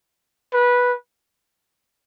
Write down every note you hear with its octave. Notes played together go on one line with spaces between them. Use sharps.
B4